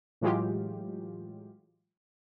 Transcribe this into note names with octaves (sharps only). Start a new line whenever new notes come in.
A2 E3 F#3 G#3 F4 G4